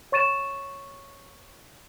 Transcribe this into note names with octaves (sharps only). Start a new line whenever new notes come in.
C#5 C#6 A6 D#7 E7